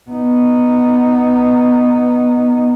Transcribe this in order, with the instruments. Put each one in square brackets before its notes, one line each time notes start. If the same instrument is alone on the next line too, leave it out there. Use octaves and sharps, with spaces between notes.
[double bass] B3 D#4